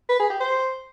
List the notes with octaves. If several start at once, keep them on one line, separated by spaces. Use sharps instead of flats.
B4
G#4
G4
C5